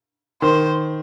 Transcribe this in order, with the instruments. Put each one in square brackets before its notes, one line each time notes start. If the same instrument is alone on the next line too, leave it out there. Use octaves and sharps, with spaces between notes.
[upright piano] D#3 [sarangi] C5